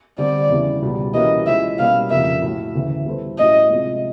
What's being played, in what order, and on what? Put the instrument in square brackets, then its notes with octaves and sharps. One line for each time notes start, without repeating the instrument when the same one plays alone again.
[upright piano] D3 G3 C4 [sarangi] D5
[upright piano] E2 C#3 E3 G3
C#2 B2 G3
[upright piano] E3 G3 A#3 C#4 F#4 [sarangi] D#5
[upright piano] F3 G#3 C#4 E4 [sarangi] E5
[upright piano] B2 G3 A#3 C#4 [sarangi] F5
[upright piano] F2 C#3 F3 A#3 [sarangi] E5
[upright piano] A2 F#3 A3
D2 C#3 E3
G3 B3 E4 A4 C5
[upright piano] A2 F#3 A3 C#4 F#4 [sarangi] D#5
[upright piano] C3 F3 G#3